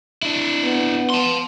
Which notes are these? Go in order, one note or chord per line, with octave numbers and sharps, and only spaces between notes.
D4 E4
B3
A5 C6